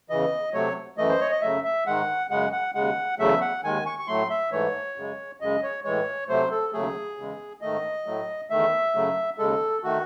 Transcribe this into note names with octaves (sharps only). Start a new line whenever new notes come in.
E2 C#3 E3 D#5
C3 F#3 A3 C#5
F#2 E3 A3 D#5
C5
C#5
D#5
F#2 C#3 F#3 A3 E5
E5
G#2 D#3 G#3 F#5
F#2 C#3 G#3 F#5
F#5
D#2 C#3 G#3 F#5
E2 C#3 F#3 A3 E5
F#5
D#2 D#3 G#3 G#5
C#6
C#6
A2 F#3 A3 C6
E5
G#2 E3 A3 C#5
F#2 C#3 G#3
F#2 C#3 G#3 D#5
C#5
A2 E3 G#3 C#5
C3 F#3 A3 C5
A4
D#2 C#3 F#3 A3 G#4
E2 C#3 G#3
G#2 D#3 A3 D#5
A2 F#3 A3
E2 D#3 A3 E5
F#2 C#3 F#3 A3
D#2 C#3 G#3 A4
D#3 A3 F#4